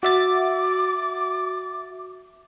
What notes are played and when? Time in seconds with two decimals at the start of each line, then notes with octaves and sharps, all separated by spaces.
0.03 F#4 E5 D6 A6